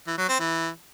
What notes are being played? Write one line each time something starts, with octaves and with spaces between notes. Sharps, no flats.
E3
F#3
C4
E3